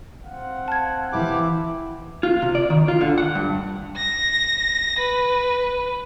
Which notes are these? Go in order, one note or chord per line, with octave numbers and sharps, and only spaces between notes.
C4 F5 F#5
A5 G#6
E3 E4 G4 D6
F4
C3
D5
D#3
F4
D3
F#5
G2
A#6
B4